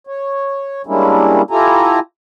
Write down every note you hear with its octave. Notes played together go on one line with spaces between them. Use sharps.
C#5
G3 G#3 A#3 C#4 D4 E4
E4 F4 G4 A4 G#5 A#5